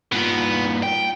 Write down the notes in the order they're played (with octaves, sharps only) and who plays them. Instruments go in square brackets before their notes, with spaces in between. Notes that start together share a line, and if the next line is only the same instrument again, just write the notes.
[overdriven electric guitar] G2 A#2 [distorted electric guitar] B3
[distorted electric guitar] G5